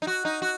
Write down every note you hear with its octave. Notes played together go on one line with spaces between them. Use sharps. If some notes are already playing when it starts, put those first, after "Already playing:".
D#4
F#4
D#4
F#4